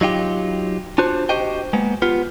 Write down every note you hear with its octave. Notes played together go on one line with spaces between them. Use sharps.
F#3 D#4 F4 G4
D4 F4 F#4 C5
F#4 G4 C5 D#5 G5
G#3 A#3 B3
B3 F4 G4